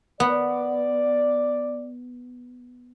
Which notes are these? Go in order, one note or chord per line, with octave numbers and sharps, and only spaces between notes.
B3 D5